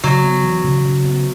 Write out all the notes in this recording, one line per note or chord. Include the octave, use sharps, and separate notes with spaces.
C#3 F#3
B3
E3
C#3
C#3
B3